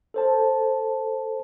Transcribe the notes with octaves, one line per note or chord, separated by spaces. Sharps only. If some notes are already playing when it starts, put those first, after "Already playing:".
A4 C5 A5